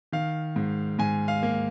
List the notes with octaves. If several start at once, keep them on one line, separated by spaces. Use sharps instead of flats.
D#3 F5
G#2
G#2 G#5
F5
A#3